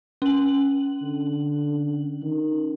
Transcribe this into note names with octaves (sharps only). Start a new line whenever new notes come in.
C#4 F#7
D3
D#3